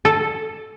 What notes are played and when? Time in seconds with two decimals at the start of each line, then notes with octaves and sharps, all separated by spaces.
0.05 A4